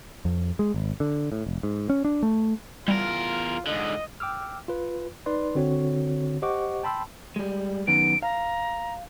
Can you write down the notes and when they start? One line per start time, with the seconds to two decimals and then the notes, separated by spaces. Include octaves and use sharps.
0.25 F2
0.59 G#3
0.74 G#1
1.00 D3
1.32 A2
1.46 F1
1.63 G#2
1.90 C#4
2.05 D4
2.23 A3
2.88 E2 G3 F4 A#4
3.67 G#2 D3 D#5
4.20 G5 D6 E6 F6
4.68 F4 B4
5.26 D#4 B4 D5 C6
5.55 D3 C4 F#4 C#5
6.42 G4 C5 D#5 F#5 C#6 D6
6.83 G5 A5 B5 C6 E6
7.36 G3 G#3
7.87 F#2 D#3 B3 D7
8.23 F5 A#5